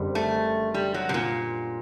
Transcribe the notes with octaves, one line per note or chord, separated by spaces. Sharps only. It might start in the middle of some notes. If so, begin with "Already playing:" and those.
Already playing: F#1 F#2 D3 G3 C4
A3
G3
F#3
C3
A#2